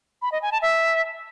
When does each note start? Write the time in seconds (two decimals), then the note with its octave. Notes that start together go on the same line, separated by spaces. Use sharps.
0.22 B5
0.32 D#5
0.42 G#5
0.52 A5
0.62 E5